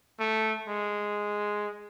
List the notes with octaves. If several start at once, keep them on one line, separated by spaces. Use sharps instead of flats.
A3
G#3